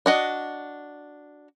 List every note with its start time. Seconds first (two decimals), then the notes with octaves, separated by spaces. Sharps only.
0.06 D4 F#4 D#5